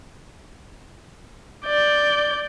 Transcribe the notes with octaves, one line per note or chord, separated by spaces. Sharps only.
D5 G6